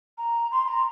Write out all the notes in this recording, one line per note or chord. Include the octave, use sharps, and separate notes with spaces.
A#5
C6
A#5